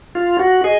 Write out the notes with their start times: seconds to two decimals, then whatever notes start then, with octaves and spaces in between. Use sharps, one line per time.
0.15 F4
0.39 F#4
0.64 G#4 D#5